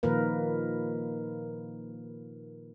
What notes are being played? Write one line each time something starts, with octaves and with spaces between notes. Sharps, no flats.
A#2 D#3 F3 A#3 A#4 B4